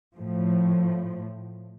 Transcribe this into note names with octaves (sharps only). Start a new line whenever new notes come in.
A2 F3